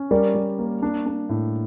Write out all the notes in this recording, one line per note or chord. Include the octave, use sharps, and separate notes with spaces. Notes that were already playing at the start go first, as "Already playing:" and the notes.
Already playing: C#4
G3 A#4 D5
G3
A#3
D4
D4
A2